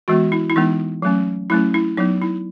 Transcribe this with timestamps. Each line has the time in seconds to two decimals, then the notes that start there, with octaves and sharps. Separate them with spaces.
0.08 E3 G#3 B3 F#4
0.32 E4
0.50 E4
0.56 E3 G#3 B3 D#4
1.02 F#3 A3 C#4
1.50 F#3 A3 C#4 E4
1.74 E4
1.97 F#3 B3 D#4
2.22 E4